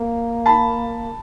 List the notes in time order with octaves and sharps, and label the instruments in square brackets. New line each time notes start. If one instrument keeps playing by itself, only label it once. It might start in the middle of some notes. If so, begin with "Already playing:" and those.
Already playing: [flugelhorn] A#3
[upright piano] A5 B5